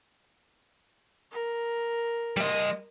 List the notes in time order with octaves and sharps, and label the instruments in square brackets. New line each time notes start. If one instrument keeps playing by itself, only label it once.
[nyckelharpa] A#4
[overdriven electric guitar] G3 D#5